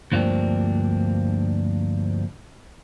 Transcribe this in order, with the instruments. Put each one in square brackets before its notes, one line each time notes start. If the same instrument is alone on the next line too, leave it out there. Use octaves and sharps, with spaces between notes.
[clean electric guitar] D2 G2 F3 A#3 C4 D4